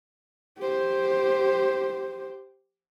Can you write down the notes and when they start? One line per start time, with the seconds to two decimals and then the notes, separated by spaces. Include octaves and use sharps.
0.59 G4 C5